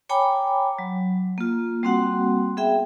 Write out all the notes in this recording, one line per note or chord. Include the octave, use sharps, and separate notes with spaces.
C#5 G5 G#5 A#5 B5 D6
F#3
A#3 F4
G3 A#3 C4 F#4 F#5
B3 G#4 E5 G5